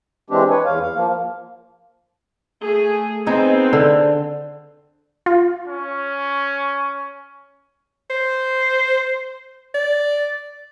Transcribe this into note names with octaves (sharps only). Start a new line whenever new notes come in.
E3 G#3 C4 D4 G4
B4 C#5
E2 F5
F5
F3 A#3
A3 G#4
B3 C4 D#4 G#4
D3
F4
C#4
C5
D5